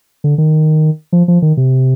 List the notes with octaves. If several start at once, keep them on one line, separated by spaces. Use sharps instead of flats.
D3
D#3
F3
F3
D#3
C3